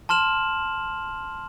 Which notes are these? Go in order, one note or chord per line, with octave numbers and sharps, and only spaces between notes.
A5 C6 F6 E7 F#7